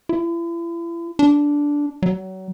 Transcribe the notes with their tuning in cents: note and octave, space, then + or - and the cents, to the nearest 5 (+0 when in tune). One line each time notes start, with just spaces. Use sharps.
E4 +40
D4 -10
F#3 +30